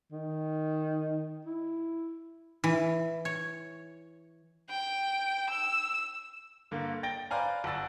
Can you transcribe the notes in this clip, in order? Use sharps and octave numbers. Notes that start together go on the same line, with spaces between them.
D#3
E4
E3
C#5
G5
E6
G2 D3 A#3
G5 A6 A#6 D7 G7
B4 C5 D5 F5 G#5 A#5
G1 F#5 E6 A6